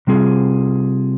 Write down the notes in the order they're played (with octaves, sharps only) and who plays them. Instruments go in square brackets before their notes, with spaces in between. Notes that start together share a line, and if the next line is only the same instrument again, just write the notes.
[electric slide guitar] C3 G3 C4 F4 G#4